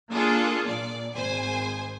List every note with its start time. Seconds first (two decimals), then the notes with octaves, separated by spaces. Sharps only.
0.10 A#3 D4 F4 G#4 A4
0.67 A#2 D5
1.15 G#1 C5 G#5